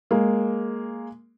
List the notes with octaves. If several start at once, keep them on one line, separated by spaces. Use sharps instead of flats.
G#3 A#3